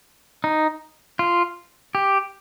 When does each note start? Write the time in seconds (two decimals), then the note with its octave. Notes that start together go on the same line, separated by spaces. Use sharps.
0.44 D#4
1.19 F4
1.95 G4